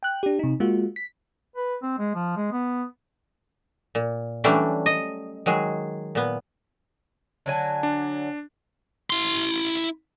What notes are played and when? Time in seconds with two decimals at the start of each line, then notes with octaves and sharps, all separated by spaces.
0.03 G5 F#6
0.23 D4 G4
0.39 C3 D#4
0.60 G#3 A#3 F4 F#4
0.96 B6
1.56 B4
1.82 C4
1.98 G#3
2.15 F3
2.36 G#3
2.52 B3
3.95 A#2
4.44 E3 F#3 G3 A3 C#4 D4
4.86 D#5
5.46 D#3 F#3 G#3 G#4
6.15 A#2 B3
7.46 D3 F#3 G#5
7.83 D4
9.10 E4 C6